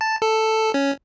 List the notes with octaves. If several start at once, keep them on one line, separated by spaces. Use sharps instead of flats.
A5
A4
C#4